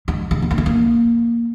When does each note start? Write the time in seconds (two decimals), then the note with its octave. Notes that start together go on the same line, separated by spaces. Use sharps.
0.08 G#3
0.31 G#3
0.42 B3
0.51 A#3
0.58 G#3
0.66 A#3